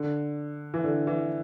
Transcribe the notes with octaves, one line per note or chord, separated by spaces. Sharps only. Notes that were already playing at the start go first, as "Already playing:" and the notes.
Already playing: D3
E3
D3
E3